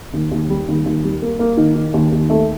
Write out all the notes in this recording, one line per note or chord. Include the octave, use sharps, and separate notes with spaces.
D#2
D#2
G3
D#2
D#2
G3
A#3
A#3
D#3
D#3
D#2
D#2
A3